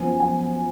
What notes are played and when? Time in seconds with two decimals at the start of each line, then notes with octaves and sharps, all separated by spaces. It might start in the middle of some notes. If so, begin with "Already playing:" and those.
Already playing: F#2 F3 B3 G#5
0.20 G#5